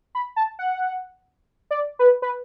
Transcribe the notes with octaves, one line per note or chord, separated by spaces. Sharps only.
B5
A5
F#5
D5
B4
B4